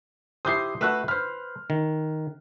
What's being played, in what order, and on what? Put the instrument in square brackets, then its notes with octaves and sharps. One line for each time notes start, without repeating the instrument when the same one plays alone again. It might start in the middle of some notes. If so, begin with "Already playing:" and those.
[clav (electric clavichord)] E4 G4 C5 [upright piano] D#6 G6 C7
[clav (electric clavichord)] A3 F#4 [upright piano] B4 E6 F#6
[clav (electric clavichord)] B4 C5 [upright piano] F6
[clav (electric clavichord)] D#3